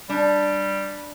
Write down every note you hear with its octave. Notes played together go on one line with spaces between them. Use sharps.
G3 D4